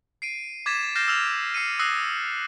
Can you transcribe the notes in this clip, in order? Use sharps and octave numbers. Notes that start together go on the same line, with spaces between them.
C7 D7 D#7
D6 G#6 A6 B6 E7
F6 G6 A6 A#6 C7 E7
E6 F6 F7
F6 C7 C#7 D#7
D#6 E6 F#6 A#6 C7